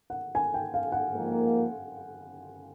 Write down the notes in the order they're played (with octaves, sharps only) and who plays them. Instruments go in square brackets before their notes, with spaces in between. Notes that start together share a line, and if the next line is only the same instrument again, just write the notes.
[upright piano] F#5
G#5
G5
F5
F#5
[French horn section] G#2 F3 A#3